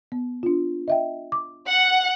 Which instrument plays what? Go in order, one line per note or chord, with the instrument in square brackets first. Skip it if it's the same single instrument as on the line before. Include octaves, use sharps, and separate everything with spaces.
[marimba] B3
D4 F4
D#5 E5 G5
D6
[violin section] F#5